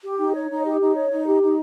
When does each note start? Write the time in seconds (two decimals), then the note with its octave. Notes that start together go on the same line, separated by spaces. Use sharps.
0.04 G4
0.19 D#4
0.34 C#5
0.50 D#4
0.65 G4
0.80 D#4
0.95 C#5
1.11 D#4
1.26 G4
1.41 D#4